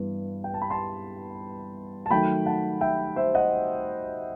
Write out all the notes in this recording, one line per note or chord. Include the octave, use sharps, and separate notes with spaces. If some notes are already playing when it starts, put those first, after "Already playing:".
Already playing: G2 E3 B3
G5
A5
B5
A5 C6
A5
D#3 F#3 A3 G5 B5
F#5 A5
E5 G5
C5 E5
D#5 F#5